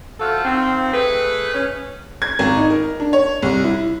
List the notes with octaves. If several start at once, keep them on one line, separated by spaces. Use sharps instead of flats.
F3 A3 F4 F#4 A4
D#3 F3 C4
A3 G#4 B4
C#4
G#6
G#1
D#4
A#4
D4
C#5
C2
E4